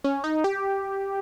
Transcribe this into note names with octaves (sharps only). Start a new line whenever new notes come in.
C#4
D#4
G4